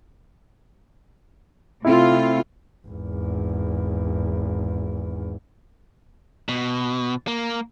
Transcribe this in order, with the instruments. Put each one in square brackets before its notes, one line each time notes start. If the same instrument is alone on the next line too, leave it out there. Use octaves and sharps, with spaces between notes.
[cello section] C3 F4 [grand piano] A3 C4 E4
[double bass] G#1 E2
[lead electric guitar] B2
A#3